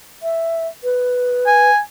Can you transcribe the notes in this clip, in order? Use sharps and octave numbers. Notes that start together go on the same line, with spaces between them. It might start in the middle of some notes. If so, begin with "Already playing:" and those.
E5
B4
G#5